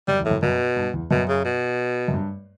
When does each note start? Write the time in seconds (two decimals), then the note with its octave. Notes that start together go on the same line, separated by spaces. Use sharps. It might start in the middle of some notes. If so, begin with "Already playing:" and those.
0.08 F#2 G3
0.19 E2
0.25 A2
0.31 F#2
0.42 F#2 B2
0.76 G2
0.94 E2
1.11 F#2 B2
1.28 C#3
1.45 B2
2.08 F#2
2.14 G2